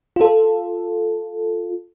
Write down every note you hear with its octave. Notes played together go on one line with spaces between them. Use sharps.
F4 A4